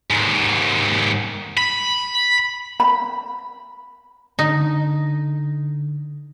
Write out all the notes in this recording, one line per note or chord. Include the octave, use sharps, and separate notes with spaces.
D#2 G#2
B5
B5
D3 D#4